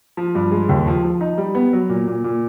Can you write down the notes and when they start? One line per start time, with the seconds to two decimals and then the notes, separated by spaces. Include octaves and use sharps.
0.17 F3
0.35 G2
0.51 G#3
0.69 D#2
0.87 F3
1.04 F3
1.21 D#4
1.38 G3
1.55 B3
1.73 F#3
1.89 A#2
2.08 A#2
2.24 A#2